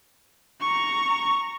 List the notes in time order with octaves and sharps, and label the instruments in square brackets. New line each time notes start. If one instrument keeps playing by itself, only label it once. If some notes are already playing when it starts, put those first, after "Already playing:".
[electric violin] A#5 C#6